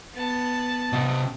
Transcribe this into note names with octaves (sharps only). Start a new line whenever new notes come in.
B3 A5
C3 D#5